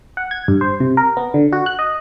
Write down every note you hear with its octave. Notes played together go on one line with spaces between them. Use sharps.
F#5
G#6
G2
C5
C3
A#4
B3
D3
F#4
F#6
D#5